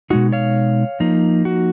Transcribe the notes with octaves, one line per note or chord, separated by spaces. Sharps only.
B2 G#3 D#4 F#4
C#5 F5
F3 A#3 D#4
F#4